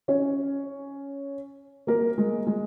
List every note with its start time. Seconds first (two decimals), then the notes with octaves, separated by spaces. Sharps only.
0.08 C#4 C#5
1.87 A#3 A#4
2.18 G#3
2.47 G#3